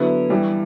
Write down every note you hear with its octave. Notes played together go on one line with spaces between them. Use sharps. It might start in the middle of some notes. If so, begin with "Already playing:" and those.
Already playing: D3 F#3 B3 E4
G2 E3 G3